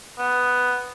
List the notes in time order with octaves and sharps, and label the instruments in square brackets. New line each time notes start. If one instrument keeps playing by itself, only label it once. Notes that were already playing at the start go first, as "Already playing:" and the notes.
[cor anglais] B3